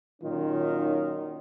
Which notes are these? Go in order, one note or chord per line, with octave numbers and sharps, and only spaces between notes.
A#2 D#3 F#3 C#4 D#4 F4